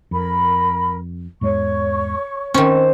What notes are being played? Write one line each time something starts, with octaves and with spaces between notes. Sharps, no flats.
F2 A#4 B5
E2 G#2 G#3 C#5 C#6
D#3 C4 C#4 C5